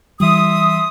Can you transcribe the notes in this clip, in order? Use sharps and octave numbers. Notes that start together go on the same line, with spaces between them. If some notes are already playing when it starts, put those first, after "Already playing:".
E3 G3 E5 C6 D#6